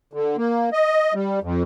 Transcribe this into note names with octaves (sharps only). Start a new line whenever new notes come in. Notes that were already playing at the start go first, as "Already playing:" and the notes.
D3
A#3
D#5
G3
F2